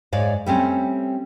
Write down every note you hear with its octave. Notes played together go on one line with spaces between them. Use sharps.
G#2 C#5 D5 F5
G3 A3 C4 C#4